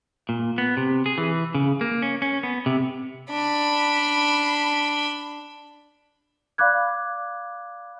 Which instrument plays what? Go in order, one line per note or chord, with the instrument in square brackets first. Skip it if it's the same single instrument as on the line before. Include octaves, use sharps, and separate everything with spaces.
[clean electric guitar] A#2
B3
C3
G#4
E3
C#3
A#3
C#4
C#4
B3
C3
[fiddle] D4 B5
[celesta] D5 F5 B5 D6 F#6 G#6